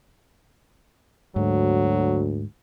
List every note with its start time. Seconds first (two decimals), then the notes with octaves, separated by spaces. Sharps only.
1.36 D2 G#2 F#3